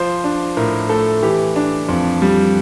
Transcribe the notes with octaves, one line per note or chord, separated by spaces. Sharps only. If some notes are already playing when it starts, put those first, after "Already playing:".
Already playing: F3 C5
D4
A2 A#4
A3 A4
E3 G4
D4
F2
G3